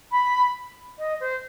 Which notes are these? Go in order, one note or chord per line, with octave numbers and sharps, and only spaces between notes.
B5
D#5
C5